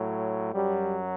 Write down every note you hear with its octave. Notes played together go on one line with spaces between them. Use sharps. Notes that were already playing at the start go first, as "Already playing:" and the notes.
Already playing: A2 F#3
F#2 F#3 G3